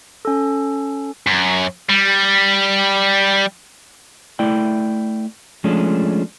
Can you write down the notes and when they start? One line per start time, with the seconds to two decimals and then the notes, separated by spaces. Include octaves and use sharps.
0.25 C#4 A4
1.27 F#2
1.89 G3
4.39 A3 E4 D5 G5
5.64 F3 G#3 A3 C#4 D4